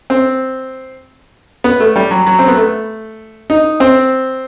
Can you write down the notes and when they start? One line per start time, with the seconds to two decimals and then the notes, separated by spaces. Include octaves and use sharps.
0.10 C4
1.64 B3
1.80 A3
1.96 G3
2.11 F#3
2.26 F#3
2.39 C4
2.48 B3
2.56 A3
3.50 D#4
3.80 C4